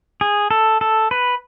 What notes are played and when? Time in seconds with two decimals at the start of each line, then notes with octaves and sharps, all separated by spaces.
0.21 G#4
0.51 A4
0.81 A4
1.11 B4